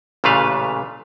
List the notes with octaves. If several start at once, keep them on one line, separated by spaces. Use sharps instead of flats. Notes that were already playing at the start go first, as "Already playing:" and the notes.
A1 A#2 C#3 A3 B4 F5